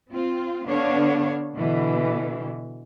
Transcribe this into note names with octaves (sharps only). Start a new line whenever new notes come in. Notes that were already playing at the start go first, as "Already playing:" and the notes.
C4 F4
D3 B3 D4 C#5 F5
B2 D3 E3